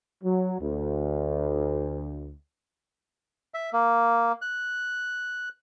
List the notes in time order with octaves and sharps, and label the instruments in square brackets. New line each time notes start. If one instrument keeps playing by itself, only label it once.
[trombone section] F#3
D2
[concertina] E5
A#3
F#6